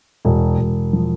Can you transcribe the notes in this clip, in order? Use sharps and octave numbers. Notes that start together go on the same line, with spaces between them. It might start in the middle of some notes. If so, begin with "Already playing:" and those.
E1
E1
F3